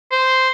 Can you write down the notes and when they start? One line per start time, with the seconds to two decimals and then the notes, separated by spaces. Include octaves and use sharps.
0.12 C5